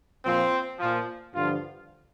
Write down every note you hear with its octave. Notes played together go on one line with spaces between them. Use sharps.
A#2 F3 C4
A#2 F3
G2 D3 F3 F4